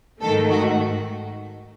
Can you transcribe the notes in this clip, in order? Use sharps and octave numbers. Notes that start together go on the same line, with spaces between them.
G#2 D#3 A3 A4
F#4